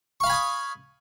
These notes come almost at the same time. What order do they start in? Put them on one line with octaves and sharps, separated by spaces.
C#6 F5 B5 G#5 D#6